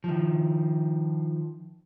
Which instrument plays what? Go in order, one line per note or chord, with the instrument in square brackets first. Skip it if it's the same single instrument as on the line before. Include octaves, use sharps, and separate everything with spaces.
[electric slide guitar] D#3 F3